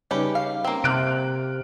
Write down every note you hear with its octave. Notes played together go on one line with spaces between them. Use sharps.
C#3 G3 C#4 D#4 G4 B4
F5
A#3 C4
C3 F6 F#6 D7